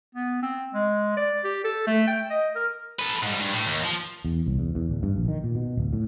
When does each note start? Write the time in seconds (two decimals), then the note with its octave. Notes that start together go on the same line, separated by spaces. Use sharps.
0.15 B3
0.42 C4
0.74 G#3
1.17 D5
1.44 G4
1.64 A4
1.87 A3
2.07 G5
2.30 D#5
2.55 A#4
2.99 A4 B4
3.22 G#2 G3
3.40 G2
3.53 A2
3.67 D#2
3.84 F3
4.25 E2
4.46 C2
4.59 E2
4.75 E2
4.89 D1
5.03 G2
5.16 A#1
5.28 D#3
5.44 A#2
5.55 B2
5.77 D1
5.93 A2